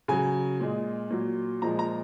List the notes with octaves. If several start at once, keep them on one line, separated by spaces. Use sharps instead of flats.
C#3 F#3 G#5
A#2 G#3
A#2 F#3
A#2 F3 G#3 A#5
A#5